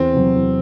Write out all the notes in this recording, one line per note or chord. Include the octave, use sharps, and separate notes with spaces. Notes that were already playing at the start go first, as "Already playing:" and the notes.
Already playing: E2 C4
C3 F#3
E2